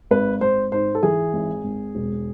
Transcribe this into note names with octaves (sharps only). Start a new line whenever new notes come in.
G#1 B4
G#1 C5
G#2 C5
A4
E3 G#4
G#1
G#1
E1